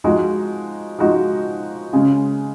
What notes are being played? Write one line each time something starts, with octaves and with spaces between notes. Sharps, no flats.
F3 G#3 D#4 F#4
F3 G#3 D#4 F#4
C#3 G#3 C#4